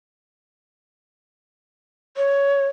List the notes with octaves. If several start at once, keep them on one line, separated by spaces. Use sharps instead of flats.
C#5